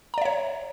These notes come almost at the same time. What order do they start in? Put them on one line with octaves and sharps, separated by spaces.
A#5 D5 E5 C#5